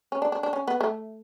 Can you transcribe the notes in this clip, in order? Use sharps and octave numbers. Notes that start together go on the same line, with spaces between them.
C#4
D4
D4
D4
C#4
B3
A3